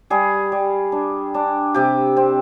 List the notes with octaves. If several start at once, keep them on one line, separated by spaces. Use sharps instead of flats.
G3 G#4
G3
D4
D4
C3 G4
C4